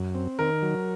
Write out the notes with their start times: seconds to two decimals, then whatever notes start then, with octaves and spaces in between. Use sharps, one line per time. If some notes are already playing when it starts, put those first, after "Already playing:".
Already playing: F#2
0.15 C4
0.39 D#3 A#4
0.63 F#3